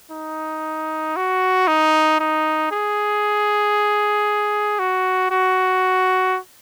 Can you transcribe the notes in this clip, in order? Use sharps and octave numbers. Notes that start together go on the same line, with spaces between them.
D#4
F#4
D#4
D#4
G#4
F#4
F#4